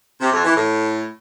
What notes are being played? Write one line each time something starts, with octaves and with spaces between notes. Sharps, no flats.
C3
F2
E3
A2